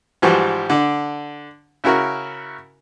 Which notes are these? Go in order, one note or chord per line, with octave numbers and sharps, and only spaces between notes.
G#2 E3 F3 G3 F#4 G4
D3 D4
C#3 E4 F#4 A#4